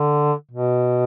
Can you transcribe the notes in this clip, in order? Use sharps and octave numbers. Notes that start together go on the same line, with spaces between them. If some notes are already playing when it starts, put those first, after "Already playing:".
Already playing: D3
B2